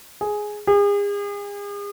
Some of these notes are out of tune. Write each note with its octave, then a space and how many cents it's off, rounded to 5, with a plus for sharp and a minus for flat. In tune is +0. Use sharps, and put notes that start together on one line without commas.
G#4 +5
G#4 -40